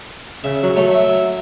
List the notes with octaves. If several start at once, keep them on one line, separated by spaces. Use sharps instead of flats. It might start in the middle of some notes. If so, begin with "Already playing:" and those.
C#3 E5
F#3
F#3 A3
E5